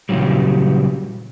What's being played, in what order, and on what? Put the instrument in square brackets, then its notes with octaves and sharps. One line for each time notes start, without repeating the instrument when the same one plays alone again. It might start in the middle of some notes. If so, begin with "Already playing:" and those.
[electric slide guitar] A#2 C#3 E3 F#3 G3